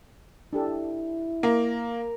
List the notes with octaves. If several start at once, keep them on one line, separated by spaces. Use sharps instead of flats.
D4 E4 G4 A4
A#3 A#4